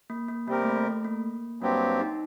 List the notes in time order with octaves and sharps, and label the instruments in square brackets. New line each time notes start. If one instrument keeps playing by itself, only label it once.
[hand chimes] A#3
A#3
[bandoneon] C3 G3 C4 G4 A#4 [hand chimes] A#3
[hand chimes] A3
A3
A3
A#3
[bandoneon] G2 F#3 C4 G4 [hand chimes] A#3
[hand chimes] D#4